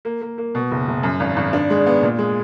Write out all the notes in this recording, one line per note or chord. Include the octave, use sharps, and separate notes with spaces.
A#3
A#3
A#3
B2
F#1
F#1
F#2
G#1
G#1
D4
G#3
B3
A#2
G#3